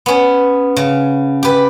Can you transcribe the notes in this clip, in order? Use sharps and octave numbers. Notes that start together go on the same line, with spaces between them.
B3 C#4
C#3
G4 B4